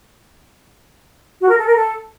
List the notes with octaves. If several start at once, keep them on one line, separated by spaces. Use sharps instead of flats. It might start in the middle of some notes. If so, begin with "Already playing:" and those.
F#4
A#4
A4
A#4
A4